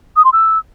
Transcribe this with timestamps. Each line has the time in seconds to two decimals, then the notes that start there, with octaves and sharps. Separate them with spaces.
0.16 D#6
0.25 C6
0.33 E6